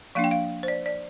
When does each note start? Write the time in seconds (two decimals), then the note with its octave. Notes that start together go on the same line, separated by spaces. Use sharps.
0.15 F3 A#3 D4 F5
0.24 G5
0.31 F5
0.63 C5
0.68 D5
0.86 D5